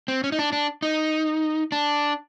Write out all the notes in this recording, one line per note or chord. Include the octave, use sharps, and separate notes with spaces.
C4
C#4
D#4
D4
D4
D#4
D4